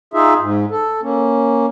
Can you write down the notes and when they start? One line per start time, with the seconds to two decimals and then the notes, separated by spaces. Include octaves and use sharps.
0.14 D#4 F4 G#4 E5
0.39 G#2
0.71 A4
1.02 A#3 C#4